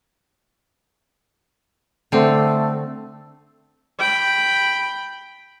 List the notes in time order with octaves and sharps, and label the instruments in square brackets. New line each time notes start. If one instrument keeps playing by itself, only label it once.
[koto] D3 C4 [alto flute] A3
[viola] G5 B5